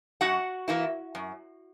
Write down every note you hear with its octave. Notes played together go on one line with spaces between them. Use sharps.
F#2 F#4 F#5
E3 A#3 E4
F#2